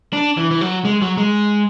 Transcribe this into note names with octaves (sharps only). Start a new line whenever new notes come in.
D4
E3
E3
F#3
G#3
F#3
G#3